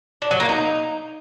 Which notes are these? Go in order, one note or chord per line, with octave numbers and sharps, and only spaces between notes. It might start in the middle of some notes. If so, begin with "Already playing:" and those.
D4
F#3
A#3
D#4